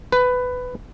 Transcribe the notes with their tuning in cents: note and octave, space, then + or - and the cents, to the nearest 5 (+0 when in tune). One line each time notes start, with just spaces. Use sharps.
B4 +15